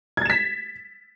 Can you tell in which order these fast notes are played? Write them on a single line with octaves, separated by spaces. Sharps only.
G#6 A6 E7 B6